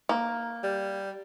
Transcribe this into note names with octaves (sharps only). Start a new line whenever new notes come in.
A#3
G3